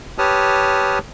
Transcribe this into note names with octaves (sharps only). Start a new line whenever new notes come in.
G4 B4 C#5 A5 D#6 F6